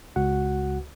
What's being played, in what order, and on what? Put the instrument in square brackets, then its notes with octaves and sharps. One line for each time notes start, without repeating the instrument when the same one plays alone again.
[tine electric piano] C#2 F#4 F#5